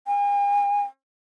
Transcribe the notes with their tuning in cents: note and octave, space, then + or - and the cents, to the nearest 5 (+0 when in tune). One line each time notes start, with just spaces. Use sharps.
G#5 -45